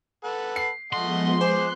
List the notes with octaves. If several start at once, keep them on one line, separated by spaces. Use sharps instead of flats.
A4 B4 F#5
C7
F3 G#3 A3 B3 D#5 F#5 C6
G#4 C5 D6 F#6